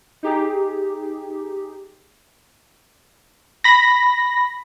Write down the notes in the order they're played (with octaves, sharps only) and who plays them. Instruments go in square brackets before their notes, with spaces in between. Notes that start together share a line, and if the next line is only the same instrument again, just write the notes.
[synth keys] D#4 G4 G#4
B5 A#6